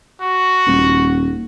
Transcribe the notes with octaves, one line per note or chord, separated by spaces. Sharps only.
F#4
D#1